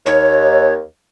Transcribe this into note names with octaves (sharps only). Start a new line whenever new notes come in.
D#2 C#5